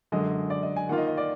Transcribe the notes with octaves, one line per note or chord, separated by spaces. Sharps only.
F#2 D3 G#3 D#5
D5
D#5
G#5
D#3 A#3 F4 F#5
D#5
D#5
D5